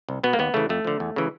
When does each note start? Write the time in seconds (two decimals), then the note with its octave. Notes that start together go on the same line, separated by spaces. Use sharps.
0.09 C2
0.23 B2 B3
0.33 A#3
0.39 D#2 B3
0.54 C#3 E3 A3
0.69 F2 A3
0.85 D3 F3
1.00 E2
1.16 C#3 E3